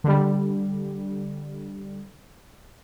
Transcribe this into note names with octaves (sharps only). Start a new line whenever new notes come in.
D3 G3